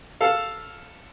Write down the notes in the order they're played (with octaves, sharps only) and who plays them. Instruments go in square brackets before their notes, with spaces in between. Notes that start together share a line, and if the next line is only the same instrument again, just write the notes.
[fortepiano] A4 F5